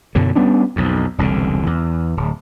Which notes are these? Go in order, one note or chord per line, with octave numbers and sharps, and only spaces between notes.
F#2 B2 D3 F#3
G3 B3 C#4 D4
B1 F2
E1 C2 A#2 D3
E2
D1